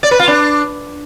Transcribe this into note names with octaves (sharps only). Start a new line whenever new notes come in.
D5
B4
F4
D4